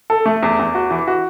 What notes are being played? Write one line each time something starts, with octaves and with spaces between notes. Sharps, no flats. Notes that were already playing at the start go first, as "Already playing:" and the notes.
A4
A3
E2
E2
F#4
E3
F#4